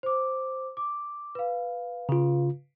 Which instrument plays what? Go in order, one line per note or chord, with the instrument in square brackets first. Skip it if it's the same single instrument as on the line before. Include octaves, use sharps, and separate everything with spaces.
[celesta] C5 D6
D6
B4 F5
[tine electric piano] C#3 F4